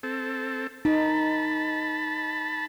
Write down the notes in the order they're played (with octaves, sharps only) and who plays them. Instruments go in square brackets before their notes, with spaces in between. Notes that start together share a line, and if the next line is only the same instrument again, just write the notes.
[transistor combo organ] C4 A4
[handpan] D#4 [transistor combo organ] A5 B5